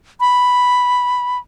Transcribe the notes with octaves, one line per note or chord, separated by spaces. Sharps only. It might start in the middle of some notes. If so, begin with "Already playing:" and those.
B5